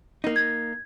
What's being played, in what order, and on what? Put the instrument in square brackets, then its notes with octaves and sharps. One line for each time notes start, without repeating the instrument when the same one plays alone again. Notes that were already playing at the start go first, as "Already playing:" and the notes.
[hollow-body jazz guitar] A#3 D#4
[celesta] G#6